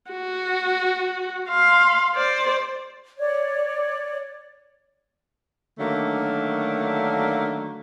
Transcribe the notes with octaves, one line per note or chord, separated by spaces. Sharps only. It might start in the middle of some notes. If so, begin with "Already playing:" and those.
F#4
F5 C6
C5 D5
C#5 D5
D3 D#3 F#3 A3 A#3 D4